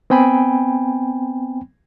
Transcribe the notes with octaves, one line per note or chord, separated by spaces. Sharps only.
B3 C4 G5 G#5 B5